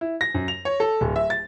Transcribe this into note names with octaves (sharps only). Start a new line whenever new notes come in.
E4
A#6
F#2
F7
C#5
A4
D1
E5
A6